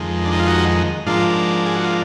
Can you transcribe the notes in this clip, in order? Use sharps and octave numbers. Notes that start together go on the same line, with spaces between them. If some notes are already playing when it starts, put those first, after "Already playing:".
Already playing: F2 D#3 G#3
D4
D#4
F4
D#4 F#4
G#2 F3 A#3 D4 F4
G#4
F#4
F4